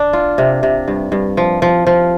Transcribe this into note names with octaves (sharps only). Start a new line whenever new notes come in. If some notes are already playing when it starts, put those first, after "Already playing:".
Already playing: D4
F4
C3
C3
G2
G2
F3
F3
F3